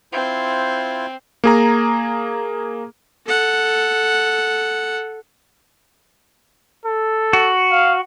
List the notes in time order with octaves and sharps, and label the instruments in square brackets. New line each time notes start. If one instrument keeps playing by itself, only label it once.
[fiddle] C4 [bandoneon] E4 F4 C5
[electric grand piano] A#3 G#4 A#5
[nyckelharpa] A4 F#5
[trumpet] A4
[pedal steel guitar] F#4
[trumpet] F5